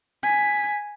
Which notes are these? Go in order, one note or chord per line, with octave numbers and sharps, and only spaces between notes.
G#5 B6